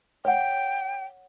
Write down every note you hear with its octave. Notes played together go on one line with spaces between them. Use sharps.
C#5 F#5 G5